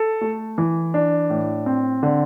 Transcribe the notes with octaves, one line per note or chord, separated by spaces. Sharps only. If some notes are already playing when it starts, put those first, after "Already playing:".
Already playing: A4
A3
E3
D4
A2
C4
D3